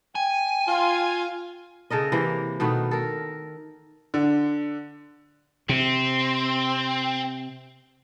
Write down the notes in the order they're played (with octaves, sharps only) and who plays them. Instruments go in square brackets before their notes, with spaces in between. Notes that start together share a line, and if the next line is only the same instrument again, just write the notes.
[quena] G5 [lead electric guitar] G#5
[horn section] F4
[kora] C#3 A4 A#4 D#5
C3 E3 A#3
B2 D#3 A3 B3
A4 A#4
[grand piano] D3
[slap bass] C3 [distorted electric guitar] C4